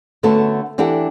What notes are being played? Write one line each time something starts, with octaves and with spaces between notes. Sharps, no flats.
D3 A3 B3 C#4 F#4 A4
E3 D4 G4 A4 F#5